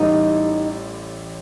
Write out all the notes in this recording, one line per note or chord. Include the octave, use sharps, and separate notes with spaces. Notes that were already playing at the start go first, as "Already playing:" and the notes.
Already playing: A1 A2 E3 G3 D#4